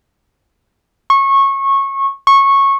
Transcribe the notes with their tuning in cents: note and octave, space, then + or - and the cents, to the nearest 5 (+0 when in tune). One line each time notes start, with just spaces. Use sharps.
C#6 -20
C#6 -15